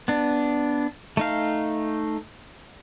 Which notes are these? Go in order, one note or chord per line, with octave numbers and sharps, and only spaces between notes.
B3 D4
A3 D#4 F5